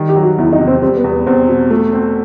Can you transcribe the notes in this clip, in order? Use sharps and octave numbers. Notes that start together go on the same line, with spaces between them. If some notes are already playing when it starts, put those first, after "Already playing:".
Already playing: D#3 G3
G4
F#3
F#4
E2 E4
D#4
C3
C4
G3 C4
B3
E2
B3
E2 C4
B2
A3
C4